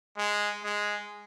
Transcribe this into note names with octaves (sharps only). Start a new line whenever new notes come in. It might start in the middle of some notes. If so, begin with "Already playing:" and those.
G#3
G#3